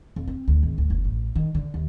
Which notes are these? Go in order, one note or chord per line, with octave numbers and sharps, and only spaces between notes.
F2
C4
D2
G#1
D2
F#1
A1
D#3
D3
D#2